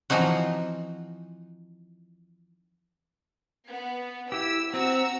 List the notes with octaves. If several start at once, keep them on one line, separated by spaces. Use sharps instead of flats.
E3 F3 C4 D#4 F#4
B3
E4 G4 E6
C4 F#4 A#5 E6